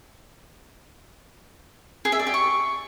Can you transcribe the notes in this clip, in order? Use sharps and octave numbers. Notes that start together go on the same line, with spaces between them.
G#4
E5
D5
G4
C#6